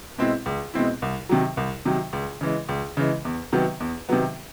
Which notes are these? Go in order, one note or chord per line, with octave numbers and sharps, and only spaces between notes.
B2 G#3 C4 E4
C#2
B2 G#3 C4 E4
C2
C3 D#3 F#3
C2
C3 D#3 F#3
C#2
C#3 E3 G#3
C#2
C#3 E3 G#3
E2
C3 D#3 F#3 B3
E2
C3 D#3 F#3 B3